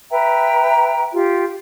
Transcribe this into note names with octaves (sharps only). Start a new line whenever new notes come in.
B4 E5 G5 A#5
F4 G4